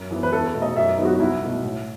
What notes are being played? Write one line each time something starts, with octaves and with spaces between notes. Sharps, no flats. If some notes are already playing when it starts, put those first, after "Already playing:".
Already playing: F#2
E3 B3
B4
E2 A4
B2 A3
D#5
F#2 E5
D#3 F#3 B3 D#4
F#4
C2 E4
B2 A3 E4
A2